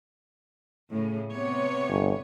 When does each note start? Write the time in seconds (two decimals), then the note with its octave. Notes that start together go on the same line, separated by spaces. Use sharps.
0.91 A2 C#3
1.32 C3 B3 C#5
1.89 G1